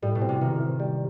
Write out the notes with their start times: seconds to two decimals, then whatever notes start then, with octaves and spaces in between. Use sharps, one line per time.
0.02 A2 G3
0.15 B2
0.22 C4
0.29 C3
0.41 D#3 E3
0.60 E3
0.80 G3